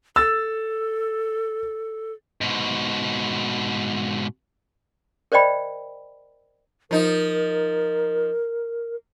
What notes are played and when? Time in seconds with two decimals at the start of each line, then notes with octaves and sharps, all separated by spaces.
0.16 A4 E6 A6
2.41 G#2 B2
5.32 A#4 C5 D5 D#5 G5 B5
6.91 F3 D#4 A#4